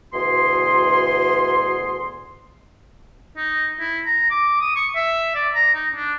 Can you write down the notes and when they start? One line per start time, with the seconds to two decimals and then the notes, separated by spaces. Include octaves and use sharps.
0.13 D2 B2 E3 G#4 C6
3.37 D#4
3.80 E4
4.05 A#5
4.31 D6
4.61 D#6
4.76 C#6
4.95 E5
5.35 D5
5.55 A#5
5.74 D#4
5.94 D4